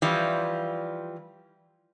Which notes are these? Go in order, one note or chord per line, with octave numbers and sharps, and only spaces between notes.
E3 F3 G3